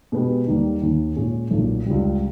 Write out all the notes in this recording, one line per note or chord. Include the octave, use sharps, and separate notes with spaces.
B2 G#3 B3 G4 B4
D#2 D#3 G3 A#3
D#2 D#3 A#3
A#2 G#3 C#4 G#4
B1 A#2 A#3 D#4
C#2 C#3 G3